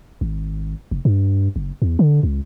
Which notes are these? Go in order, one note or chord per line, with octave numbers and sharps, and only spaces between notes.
G#1
F1
G2
F#1
E2
D3
C#2